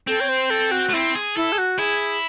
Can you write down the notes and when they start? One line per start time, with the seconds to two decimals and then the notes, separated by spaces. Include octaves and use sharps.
0.07 C4 A4
0.20 C#5
0.29 C5
0.50 A4
0.71 F#4
0.89 A3
0.93 C4 E4
1.15 G#4
1.36 E4 A4
1.52 G#4
1.58 F#4
1.79 E4 G#4